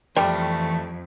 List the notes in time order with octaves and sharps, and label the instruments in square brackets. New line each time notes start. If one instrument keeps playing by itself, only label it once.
[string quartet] F2 [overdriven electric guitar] E3 G5 [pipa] G3 [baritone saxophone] A3